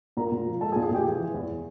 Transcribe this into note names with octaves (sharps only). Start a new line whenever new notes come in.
A#2 A#4 A#5
A#2
F3
G#3 A4 A5
G#4 G#5
A#2
G#4 G#5
A#2 G4 G5
E3 G#4 G#5
E3
E2